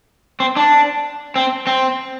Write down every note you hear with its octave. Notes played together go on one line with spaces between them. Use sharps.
C4
D4
C4
C4